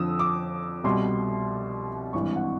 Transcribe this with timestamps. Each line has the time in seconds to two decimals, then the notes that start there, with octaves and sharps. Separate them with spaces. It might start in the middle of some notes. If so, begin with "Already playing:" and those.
Already playing: F2 D3 F3 D#6 E6
0.19 D6
0.84 C2 B2 G3 C6
2.13 G#1 G2 E3 C#6
2.36 F#5